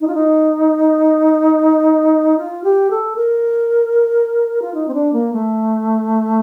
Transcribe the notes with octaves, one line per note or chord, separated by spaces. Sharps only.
D#4
F4
D#4
F4
G4
A4
A#4
F4
D#4
C4
D4
A#3
A3